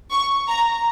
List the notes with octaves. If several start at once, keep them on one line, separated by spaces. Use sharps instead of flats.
C#6
A#5